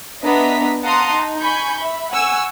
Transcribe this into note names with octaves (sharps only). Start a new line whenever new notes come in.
B3 D4 D#5 E5 A#5 B6
F5 F#5 A5 A#5 C6 D#6
D#4
G#5 B5 C#6 G6
E5 B5
F#5 G#5 C#6 E6